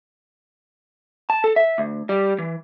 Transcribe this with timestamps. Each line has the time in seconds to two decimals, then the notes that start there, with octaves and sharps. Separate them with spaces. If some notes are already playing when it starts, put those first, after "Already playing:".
1.30 A5
1.44 A4
1.56 E5
1.78 D2
2.09 G3
2.39 E3